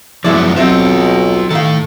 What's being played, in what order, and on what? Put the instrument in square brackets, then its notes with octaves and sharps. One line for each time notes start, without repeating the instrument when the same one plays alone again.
[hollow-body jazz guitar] F#2 E4 D5 [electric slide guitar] F3 G#3 B3
[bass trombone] B1 [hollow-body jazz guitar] F#3 C4 E5 [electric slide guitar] F4 D#5
[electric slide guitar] A2 A4 [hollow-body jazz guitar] D#3 F5